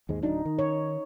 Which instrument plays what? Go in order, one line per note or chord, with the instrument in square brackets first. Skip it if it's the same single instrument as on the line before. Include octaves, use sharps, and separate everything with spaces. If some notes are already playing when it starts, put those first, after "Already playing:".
[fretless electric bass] D#2 G#2 G#3
[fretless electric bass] D1 F#3 D4 [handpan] D#4
[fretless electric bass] D#3
[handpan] C#5